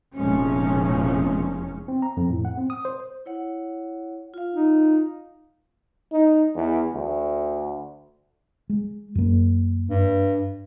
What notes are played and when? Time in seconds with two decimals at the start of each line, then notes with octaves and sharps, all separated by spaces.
0.16 F1 E2 A#2 F3 G#3 C#4
1.88 C4
2.02 A#5
2.17 F2
2.30 A2
2.45 F#5
2.57 C4
2.70 D#6
2.85 C5
3.26 E4 C#5 F#5
4.34 F4 F5
4.54 D#4
6.12 D#4
6.56 E2
6.93 D2
8.69 G#3
9.15 F#2 A#3
9.90 G2